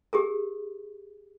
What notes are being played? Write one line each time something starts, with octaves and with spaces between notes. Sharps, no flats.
G4 G#4 A#4